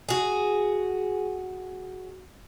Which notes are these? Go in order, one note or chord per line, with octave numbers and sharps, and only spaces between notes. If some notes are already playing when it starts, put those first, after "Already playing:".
F#4 G#4